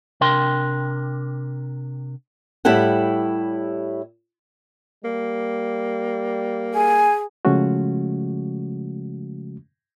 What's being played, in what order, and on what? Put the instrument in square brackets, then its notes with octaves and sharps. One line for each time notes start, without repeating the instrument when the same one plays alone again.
[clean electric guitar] C3 D4 A#4 G5 C6
[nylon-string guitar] A2 G3 E4 G4 A4 F#5
[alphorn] G3 [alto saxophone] A#3
[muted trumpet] G#4 [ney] G#5
[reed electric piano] C#3 F3 G#3 A3 C#4 F#4